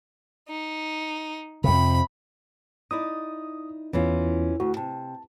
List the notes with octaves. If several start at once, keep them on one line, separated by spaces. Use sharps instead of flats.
D#4
F2 C3 B5
D#4 E4 D5 D#6
E2 E3 C#4 F4
D2 F#4
C3 A5